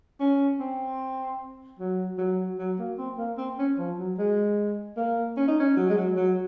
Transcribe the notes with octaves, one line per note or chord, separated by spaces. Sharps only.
C#4
C4
F#3
F#3
F#3
A#3
C4
A#3
C4
C#4
F3
F#3
G#3
A#3
C#4
D#4
C#4
F#3
G#3
F#3
F#3